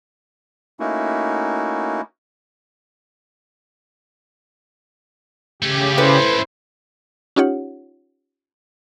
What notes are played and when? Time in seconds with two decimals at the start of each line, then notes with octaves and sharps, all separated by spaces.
0.80 A3 A#3 C#4 D#4 E4 F#4
5.62 C#3 A3 C#4 G4
5.98 E4 A4 B4 C5
7.36 C#4 D#4 F4 G4 C#5 F#5